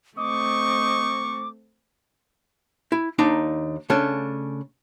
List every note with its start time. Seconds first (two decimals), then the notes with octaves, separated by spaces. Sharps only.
0.18 A3 C4 D#5 C#6 D6
2.92 E4
3.19 D#2 D4 D#4 A#5
3.90 C#3 A3 C#4 D4